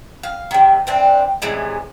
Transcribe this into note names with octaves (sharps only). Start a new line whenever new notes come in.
F5
C3 D#3
E3 C4 D4
A2 C3 E3 G#3